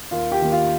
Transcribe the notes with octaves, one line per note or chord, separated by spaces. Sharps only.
D#2 F4 F5
G4 G5
D#3 A#3
F4 F5